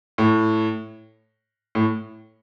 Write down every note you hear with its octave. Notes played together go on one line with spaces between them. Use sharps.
A2
A2